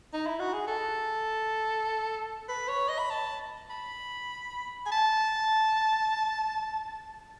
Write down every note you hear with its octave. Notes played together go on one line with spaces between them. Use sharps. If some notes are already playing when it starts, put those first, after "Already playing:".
D#4
E4
F#4
G#4
A4
B4
C#5
D#5
B5
A5
B5
G#5
A5